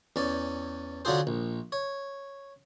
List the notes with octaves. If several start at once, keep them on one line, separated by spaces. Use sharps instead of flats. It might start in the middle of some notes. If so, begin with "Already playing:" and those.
E2 C#4 D5
D3 F#3 D4 F4 G#4 C5
A#1
C#5